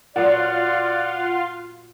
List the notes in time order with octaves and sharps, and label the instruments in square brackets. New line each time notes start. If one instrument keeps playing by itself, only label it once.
[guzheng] A#2 F#3 B3 [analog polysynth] F4 F5 C6 [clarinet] D5 [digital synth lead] F#5